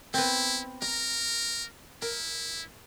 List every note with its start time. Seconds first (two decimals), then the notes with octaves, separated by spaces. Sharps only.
0.14 B3 C4 E4
0.82 A#4 A#5
2.02 E4 A#4